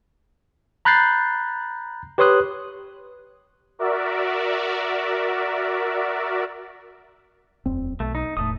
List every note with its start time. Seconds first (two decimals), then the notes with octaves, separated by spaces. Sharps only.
0.85 A#5 B5 F#6 G6 A6 C7
2.18 G4 B4 C#5 C6 D#6 F#6
3.79 F#4 A#4 D5 E5
7.66 D#1 F2 C4
8.00 B1 A3
8.15 D#4
8.37 E1 A2 A3 D#6